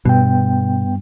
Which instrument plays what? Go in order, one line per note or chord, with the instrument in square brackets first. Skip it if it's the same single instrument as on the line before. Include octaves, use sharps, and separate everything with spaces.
[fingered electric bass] G2 [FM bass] B2 [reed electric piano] B3 G5